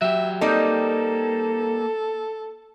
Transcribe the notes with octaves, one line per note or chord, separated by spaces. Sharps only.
F#3 G4 E5
G3 A#3 C4 D#4 A4